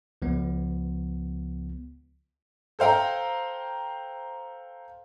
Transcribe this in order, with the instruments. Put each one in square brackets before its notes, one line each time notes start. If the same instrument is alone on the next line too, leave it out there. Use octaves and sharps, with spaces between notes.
[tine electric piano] C#2 F3 B3
[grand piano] A4 C5 F5 G5 A#5